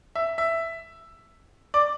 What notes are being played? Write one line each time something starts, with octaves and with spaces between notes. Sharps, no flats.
E5
E5
D5